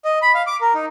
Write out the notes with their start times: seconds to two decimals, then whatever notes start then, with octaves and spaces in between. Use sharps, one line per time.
0.05 D#5
0.22 B5
0.35 F5
0.47 D6
0.61 A#4
0.74 D#4